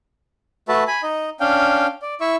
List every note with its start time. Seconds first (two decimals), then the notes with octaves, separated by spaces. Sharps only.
0.68 A3 F#4 B4 E5 A5
0.87 G#5 B5
1.03 D#4 D#5
1.40 C#4 D4 F5 G5
2.02 D5
2.21 E4 E5 C#6 E6